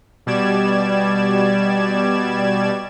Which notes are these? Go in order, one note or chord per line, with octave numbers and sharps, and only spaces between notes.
B2 G3 D5 G#6 E7